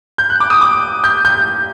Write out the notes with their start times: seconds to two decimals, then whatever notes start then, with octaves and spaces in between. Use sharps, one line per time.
0.18 G6
0.30 F#6
0.40 D6
0.50 D#6
0.61 D6
1.04 G6
1.25 G6